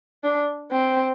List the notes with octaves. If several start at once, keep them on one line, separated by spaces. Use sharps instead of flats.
D4
C4